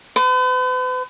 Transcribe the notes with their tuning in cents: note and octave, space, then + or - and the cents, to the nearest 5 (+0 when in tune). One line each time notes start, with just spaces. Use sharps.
B4 +45